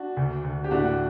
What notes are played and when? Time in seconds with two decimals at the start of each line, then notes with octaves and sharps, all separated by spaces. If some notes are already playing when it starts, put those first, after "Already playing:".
Already playing: D4 F#4
0.17 D2
0.44 D2
0.64 G4
0.71 A2 D4 F#4